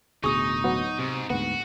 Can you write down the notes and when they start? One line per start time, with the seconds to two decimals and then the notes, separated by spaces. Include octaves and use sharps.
0.24 D1 D2 B2 D#4 G#4 C#6 D#6
0.64 F#3 B3 F#4
0.99 G#2 C3
1.30 D2 G#2 B3 F#4